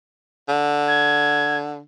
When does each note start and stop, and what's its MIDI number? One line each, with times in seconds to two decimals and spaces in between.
0.49 1.80 50
0.88 1.57 92